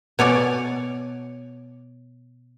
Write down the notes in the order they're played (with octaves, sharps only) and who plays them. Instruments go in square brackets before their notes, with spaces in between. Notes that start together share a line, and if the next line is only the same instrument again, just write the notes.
[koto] B2 C#5 D5 G#5